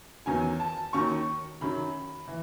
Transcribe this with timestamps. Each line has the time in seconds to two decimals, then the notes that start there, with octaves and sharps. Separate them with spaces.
0.26 E2 D#3 F#3 G#5
0.60 A5
0.93 D#2 D#3 F#3 C#6
1.61 F#2 D#3 F#3 B5
2.28 E3